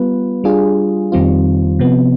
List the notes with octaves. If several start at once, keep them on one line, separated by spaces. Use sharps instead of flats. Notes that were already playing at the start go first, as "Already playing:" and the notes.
Already playing: G3 B3 F4 B4
G3 D4 F4 G#4
F2 D#3 G3 C4 F4
C3 F3 B3